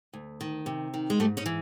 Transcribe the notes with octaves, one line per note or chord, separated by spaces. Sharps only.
D2
D#3
C3
D#3
G#3
G#2 G3 A3
C#4 D#4
E3